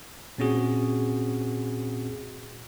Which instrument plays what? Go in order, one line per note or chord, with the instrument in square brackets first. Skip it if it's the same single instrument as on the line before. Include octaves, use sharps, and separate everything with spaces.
[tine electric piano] A#2 C4 C#4 F#4 G#4